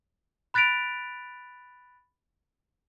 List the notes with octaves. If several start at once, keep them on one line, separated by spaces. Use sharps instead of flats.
B5 F#6 A6 B6 D7 F7